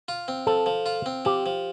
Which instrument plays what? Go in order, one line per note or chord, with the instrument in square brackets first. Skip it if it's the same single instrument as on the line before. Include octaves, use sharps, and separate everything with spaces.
[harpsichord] F4
C4
[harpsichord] F3 [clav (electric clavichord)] A4
[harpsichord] F3
F4
C4
[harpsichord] F3 [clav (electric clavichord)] G4
[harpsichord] F3